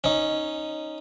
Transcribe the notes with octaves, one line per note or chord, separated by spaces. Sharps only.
C#4 D#4